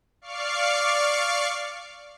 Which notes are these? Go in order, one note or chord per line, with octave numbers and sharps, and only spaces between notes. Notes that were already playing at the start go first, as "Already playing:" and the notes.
D5 F5 C#6 D6 F6 C7